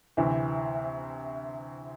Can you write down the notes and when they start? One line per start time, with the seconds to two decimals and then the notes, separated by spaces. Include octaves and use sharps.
0.17 D2 C3 E3